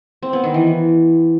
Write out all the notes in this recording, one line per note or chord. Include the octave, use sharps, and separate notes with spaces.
C4
B3
D#3
E3